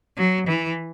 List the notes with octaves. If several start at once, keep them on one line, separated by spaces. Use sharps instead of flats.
F#3
E3